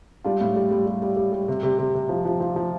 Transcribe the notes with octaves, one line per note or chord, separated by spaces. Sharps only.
G3 D4 F4
A2
G3
G3
G3
G3
G3
G3
C3
C3
C3
C3
F3
F3
F3
F3